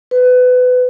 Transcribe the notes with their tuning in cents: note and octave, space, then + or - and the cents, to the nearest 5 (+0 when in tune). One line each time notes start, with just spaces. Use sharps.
B4 +25